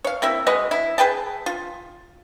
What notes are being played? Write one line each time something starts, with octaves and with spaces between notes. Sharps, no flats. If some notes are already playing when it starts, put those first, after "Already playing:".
C#5 F5
C3 A#3 E4 E5
G#3 F#4 B4 D#5
E4
G#4 B4 G5 A5
F4